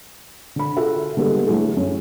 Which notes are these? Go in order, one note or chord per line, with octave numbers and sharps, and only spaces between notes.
D3 B5
F4 F#4 G#4 A4 E5
D3 G3 G#3 A#3 B3 A4
F#3 A3 E4 F#4 G#4 A4
F#2